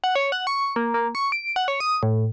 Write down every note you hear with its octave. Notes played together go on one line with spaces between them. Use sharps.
F#5
C#5
F#5
C#6
A#3
A#3
C#6
D7
F#5
C#5
D#6
A2